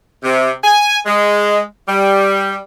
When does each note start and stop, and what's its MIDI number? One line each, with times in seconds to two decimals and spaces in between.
0.24 0.51 48
0.64 0.98 80
1.06 1.61 56
1.88 2.56 55